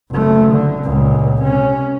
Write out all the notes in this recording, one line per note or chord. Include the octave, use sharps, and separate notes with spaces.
F#1 A3
D3
C#2 A#2
C3 C#4